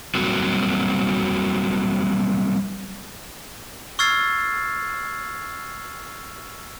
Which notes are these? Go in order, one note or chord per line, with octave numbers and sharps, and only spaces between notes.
F#3 G3 A#3 C4 F#4
C#6 E6 F6 G#6 A6 C7